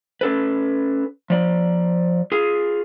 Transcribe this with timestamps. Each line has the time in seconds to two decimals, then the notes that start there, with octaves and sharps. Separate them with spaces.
0.21 C#4 A4 B4
1.30 F3 D5
2.32 F4 G#4